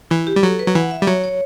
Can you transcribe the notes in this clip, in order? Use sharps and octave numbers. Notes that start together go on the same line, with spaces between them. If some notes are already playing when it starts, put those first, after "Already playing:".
E3 E4
G4
G3
F#3 A4
B4
F#3
E3 F#5
E5
G3
F#3 C#5
C#5